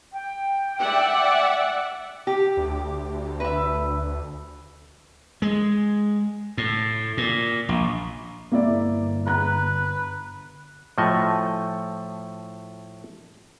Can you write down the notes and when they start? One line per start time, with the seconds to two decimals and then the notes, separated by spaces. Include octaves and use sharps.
0.13 G5
0.80 D5 E5 F#5
2.27 G4
2.57 D2
3.40 B4 E5
5.42 G#3
6.57 A2
7.17 A#2
7.69 A#1
8.52 G1 A#3 E4 D5
9.27 B4 A#5 F#6
10.98 A2 F3 A3 F#4 D#5 G#5